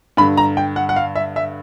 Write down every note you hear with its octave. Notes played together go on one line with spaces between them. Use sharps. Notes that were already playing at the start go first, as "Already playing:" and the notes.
G2 D3 B5
A#5
G5
F#5
F#5
F5
E5
E5